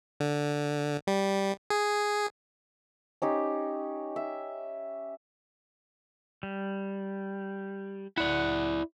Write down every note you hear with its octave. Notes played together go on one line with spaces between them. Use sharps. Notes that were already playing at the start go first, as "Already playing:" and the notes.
D3
G3
G#4
C#4 D#4 G4
E5
G3
E4 D5 F#5